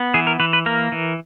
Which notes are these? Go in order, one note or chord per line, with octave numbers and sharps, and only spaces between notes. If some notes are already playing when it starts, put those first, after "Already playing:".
Already playing: B3
E3 G#4
A#4
E3 B4
B4
A#3 A#4
E3